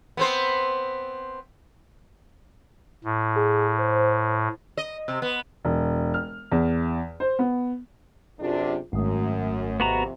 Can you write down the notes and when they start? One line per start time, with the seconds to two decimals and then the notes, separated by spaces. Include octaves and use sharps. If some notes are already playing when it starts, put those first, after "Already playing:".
0.17 B3 C4 C5
3.04 A2
3.36 G#4
3.79 C5
4.77 D#5
5.08 C3
5.22 B3
5.65 E1
6.14 F6
6.52 E2
7.20 C5
7.39 B3
8.40 F#2 C3 D4 F4 G#4
8.93 G#1 F#2 A3 D#6
9.80 F2 C3 B3 F#4 A#5